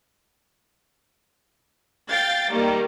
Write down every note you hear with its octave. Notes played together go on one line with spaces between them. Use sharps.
F5 G5 A6
D#3 G3 A#3